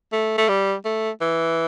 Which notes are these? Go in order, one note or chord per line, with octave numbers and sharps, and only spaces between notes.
A3
A3
G3
A3
E3